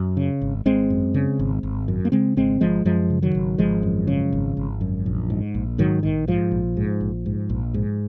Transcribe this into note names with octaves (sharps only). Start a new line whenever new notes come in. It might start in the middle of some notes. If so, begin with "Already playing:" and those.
Already playing: F#2
C#3
G#1
G#1 G#3 C4
F#2
C#3
G#1
G#1
F#2
A#3
C#3 G#3 C4
G#1 G#3 C4
G#1 F3 G#3
F#2 F3 G#3
C#3
D#3 F#3
G#1
G#1 F3 G#3
F#2
C#3
G#1
G#1
F#2
A#1
G#2
A#1
G#2 D#3 F#3
A#1 D#3
G#2 F3
A#1
G#2
A#1
G#2
A#1
G#2